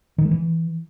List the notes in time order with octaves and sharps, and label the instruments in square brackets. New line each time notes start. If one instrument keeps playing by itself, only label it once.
[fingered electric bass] D#3
G#3
E3